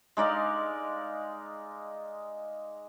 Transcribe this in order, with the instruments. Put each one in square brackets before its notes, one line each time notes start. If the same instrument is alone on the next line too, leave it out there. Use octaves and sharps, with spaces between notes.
[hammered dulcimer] G#3 D#4 D5 F5